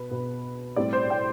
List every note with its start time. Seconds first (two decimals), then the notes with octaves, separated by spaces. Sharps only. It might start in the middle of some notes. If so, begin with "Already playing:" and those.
Already playing: B2 B3 B4
0.11 B2 B3
0.76 A2 G3 C4 D5
0.93 C5
1.10 G5